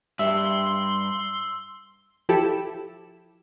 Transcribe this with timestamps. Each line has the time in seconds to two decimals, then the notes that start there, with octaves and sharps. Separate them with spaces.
0.19 G2 E5 C6 E6
2.29 F3 E4 G4 A4 E7